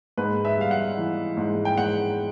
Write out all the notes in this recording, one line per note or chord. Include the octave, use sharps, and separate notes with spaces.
G#2 B4
E5
G3 F5
F#5
E3
G#2
G5
G#2 F#5